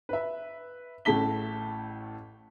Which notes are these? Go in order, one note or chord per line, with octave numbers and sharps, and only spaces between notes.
B4 E5
A1 A2 A3 A5 B6 G7